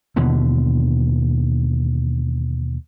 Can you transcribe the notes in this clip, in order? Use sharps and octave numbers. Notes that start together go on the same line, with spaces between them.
D#2 B2 D3 E3